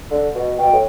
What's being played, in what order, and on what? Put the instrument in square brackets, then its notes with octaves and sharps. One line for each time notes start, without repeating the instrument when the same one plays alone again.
[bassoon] D3
B2
[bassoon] B2 [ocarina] G5
[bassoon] A2